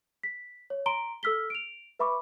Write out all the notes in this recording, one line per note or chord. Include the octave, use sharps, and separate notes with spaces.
B6
C#5
A#5 C6 D7 G7
A4 E6 F6 B6 G7
D7 F7
B4 E5 B5 C#6 D6